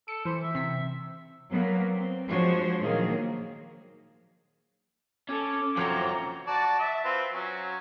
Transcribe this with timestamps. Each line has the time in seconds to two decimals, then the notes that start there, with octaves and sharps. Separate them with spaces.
0.08 A4 C#7
0.25 E3 C5
0.43 E5
0.55 C3 B6
1.51 F#3 A#3 B3
1.93 C4
2.28 F3 G#3 D4 F#4 C5 C#5
2.80 A#2 D#3 F3 F#3 A#3 G#4
5.29 C#4 A4 D6
5.77 F#2 F3 F#3 A3 C4 C#5 A#5
6.47 F#4 D5 A5
6.80 E5
7.05 C4 F4 B4
7.33 F#3 C#4